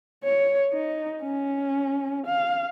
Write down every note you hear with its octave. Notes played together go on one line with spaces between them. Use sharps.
C#5
D#4
C#4
F5